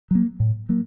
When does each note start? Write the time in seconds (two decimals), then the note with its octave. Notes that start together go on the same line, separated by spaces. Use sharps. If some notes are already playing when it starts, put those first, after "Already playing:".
0.11 F#3 A#3
0.40 A2
0.69 F#3 A#3